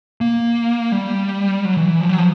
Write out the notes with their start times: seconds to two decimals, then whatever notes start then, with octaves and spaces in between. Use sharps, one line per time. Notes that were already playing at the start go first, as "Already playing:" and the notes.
0.21 A#3
0.92 G3
1.65 F#3
1.77 E3
1.88 E3
2.01 F3
2.09 F#3
2.18 F3